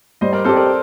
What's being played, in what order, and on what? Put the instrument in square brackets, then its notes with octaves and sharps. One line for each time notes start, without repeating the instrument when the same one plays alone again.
[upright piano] G3 [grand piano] C5 D#5
[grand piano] A#4 D5
[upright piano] C4 G4 [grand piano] A4 C5
[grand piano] A#4 D5